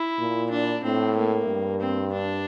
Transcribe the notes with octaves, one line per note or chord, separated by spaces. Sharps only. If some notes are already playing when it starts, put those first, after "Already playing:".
Already playing: E4
A#2
D4
A2 C4
A#3
G2
C4
D4